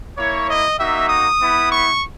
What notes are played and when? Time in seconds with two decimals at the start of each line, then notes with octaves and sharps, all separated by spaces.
0.17 A#3 E4 C#5
0.48 D#5
0.79 A#3 D#4 F#4 E5
1.09 D#6
1.41 B3 E4
1.71 C#6